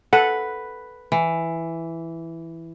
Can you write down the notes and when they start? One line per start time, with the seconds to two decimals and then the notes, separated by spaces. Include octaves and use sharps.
0.13 A4 B4 F#5
1.12 E3